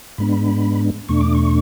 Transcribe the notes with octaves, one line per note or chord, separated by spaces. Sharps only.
G#2 G#3 B3 D4 B5
E2 B2 A3 D4 C#6
D6
C#6